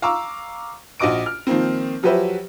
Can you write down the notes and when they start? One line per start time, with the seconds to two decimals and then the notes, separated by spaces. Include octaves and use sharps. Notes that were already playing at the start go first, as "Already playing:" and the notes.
0.02 F5 A#5 C#6 D6 E6
1.00 A#1 F#4 D#5 D6 D7
1.26 F6
1.47 D#3 F3 A#3 C4
2.03 F3 F#3 G4 B4 C5 E5